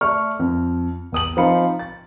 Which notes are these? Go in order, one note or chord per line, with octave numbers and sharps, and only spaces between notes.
A3 D5 C#6 F6
F2
E2 D#6 F#7
F3 C4 D#4 F5 B5 C#7
A6